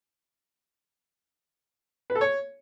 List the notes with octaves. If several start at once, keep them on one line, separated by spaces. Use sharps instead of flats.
B4
A4
C#5